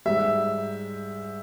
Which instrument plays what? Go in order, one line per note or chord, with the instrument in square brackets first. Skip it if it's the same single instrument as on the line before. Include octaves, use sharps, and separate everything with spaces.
[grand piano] G#2 G3 E5